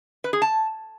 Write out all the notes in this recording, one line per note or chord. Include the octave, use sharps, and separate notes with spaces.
B4
G#4
A5